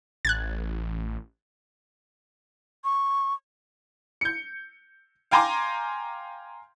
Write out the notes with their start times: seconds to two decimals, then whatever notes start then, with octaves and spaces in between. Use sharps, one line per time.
0.25 A1 F#6 G#6 A6
2.84 C#6
4.21 G6 C#7
5.31 F5 G5 G#5 A#5 C6 D6